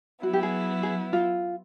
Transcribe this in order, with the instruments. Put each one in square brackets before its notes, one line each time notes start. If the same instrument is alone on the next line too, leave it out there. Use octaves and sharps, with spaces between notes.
[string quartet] F#3 B3 E4 [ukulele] F#4
[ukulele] G4
G#4
G#4
F4